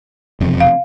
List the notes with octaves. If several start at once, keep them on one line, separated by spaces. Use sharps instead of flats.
E1 F2 C3
F5